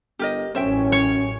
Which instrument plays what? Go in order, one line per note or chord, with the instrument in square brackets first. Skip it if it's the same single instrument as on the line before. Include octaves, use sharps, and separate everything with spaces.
[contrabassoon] G1 [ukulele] G4 A#4 D#5
[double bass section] A1 C#4 [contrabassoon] F#2 [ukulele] C5 E5 G5
[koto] C#5